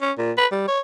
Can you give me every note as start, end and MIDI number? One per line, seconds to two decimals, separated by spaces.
0.01 0.12 61
0.18 0.32 46
0.38 0.47 71
0.52 0.64 55
0.68 0.80 73